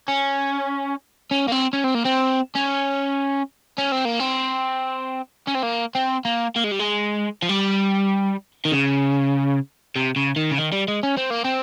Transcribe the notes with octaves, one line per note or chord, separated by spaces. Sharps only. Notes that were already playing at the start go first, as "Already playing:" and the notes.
C#4
C#4
A#3
C4
C#4
C4
A#3
C4
C#4
C#4
C4
A#3
C4
C#4
C4
A#3
C4
A#3
A#3
G#3
G3
G#3
F3
G3
D#3
C#3
C3
C#3
D#3
C#3
D#3
G3
G#3
C#4
C4
A#3
C4